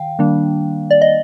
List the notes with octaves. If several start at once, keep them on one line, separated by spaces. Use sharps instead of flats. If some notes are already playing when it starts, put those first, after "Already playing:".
Already playing: D#3 F5 G5
D#3 G3 A#3 D4
D5
D#5